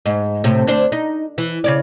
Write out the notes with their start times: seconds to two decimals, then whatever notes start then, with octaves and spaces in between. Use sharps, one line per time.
0.06 G#2
0.44 A2 C3
0.67 D2 D4 C5
0.92 D#4
1.38 E3
1.64 C#3 C#5 D5